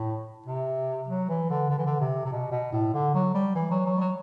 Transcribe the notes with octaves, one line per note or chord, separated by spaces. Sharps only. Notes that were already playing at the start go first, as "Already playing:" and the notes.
Already playing: A2
C3
F#3
E3
D3
D3
E3
D3
C3
C3
B2
B2
A2
D3
F#3
G3
E3
F#3
F#3
G3
F#3